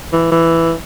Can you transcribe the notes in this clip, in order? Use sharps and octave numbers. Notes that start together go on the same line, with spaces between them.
E3
E3